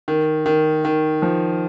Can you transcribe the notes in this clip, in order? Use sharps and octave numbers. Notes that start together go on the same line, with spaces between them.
D#3
D#3
D#3
F3